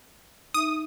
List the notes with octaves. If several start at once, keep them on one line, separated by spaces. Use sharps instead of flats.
D#4 E5 D#6